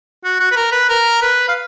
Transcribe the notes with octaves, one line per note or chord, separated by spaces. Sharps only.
F#4
F#4
B4
A#4
B4
A#4
B4
F5